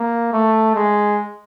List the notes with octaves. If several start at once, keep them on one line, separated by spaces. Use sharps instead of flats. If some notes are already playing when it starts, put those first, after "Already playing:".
Already playing: A#3
A3
G#3